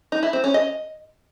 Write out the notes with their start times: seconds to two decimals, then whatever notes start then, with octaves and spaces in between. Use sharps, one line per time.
0.12 D#4
0.23 E4
0.33 C4
0.44 C#4
0.54 D#5